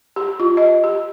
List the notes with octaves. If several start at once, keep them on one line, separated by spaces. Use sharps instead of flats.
G4
F4
D#5
G4